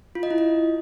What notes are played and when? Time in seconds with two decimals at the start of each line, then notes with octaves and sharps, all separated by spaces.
0.15 F4
0.23 D#5
0.31 E4
0.38 D#5